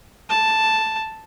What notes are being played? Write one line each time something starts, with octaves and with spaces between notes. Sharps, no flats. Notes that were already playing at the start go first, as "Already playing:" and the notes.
A5